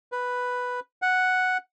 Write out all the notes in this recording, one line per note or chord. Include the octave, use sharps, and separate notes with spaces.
B4
F#5